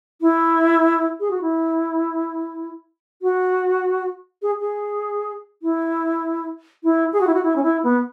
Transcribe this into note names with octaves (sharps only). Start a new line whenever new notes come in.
E4
G#4
F#4
E4
F#4
G#4
G#4
E4
E4
G#4
F#4
E4
F#4
E4
C#4
E4
B3